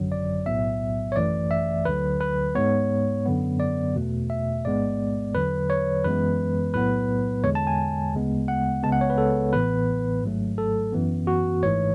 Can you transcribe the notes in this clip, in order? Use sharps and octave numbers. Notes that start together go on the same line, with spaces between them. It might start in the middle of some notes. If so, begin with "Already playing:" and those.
Already playing: G#1 F#2 D3 F#3
D5
B1 A2 F#3 B3 E5
C#5
G#1 F#2 E3 A3 D5
E5
D2 D3 F#3 B4
B4
G#2 G#3 B3 C#5
F#2 D3 F#3 B3
D5
E2 B2 A3
E5
A1 G#2 G#3 B3 D5
E2 D3 F#3 B4
C#5
F#2 E3 G#3 B3 B4
B1 A2 F#3 B3 B4
E2 D3 G#3 C#5
A5
G#5
D2 C#3 G#3 B3
F#5
C#2 C#3 G#3 B3 A5
F#5
C#5
B4
A4
A1 A2 E3 B3 B4
G#1 G#2 F#3 A3
A4
F#2 E3 B3
F#4
G#1 G#2 E3 A3 C#5